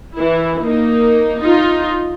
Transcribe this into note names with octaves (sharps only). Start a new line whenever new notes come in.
E3 E4
A#3 D#4
D#4 F4